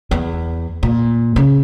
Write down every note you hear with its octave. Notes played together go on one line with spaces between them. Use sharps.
E2
A#2
C#3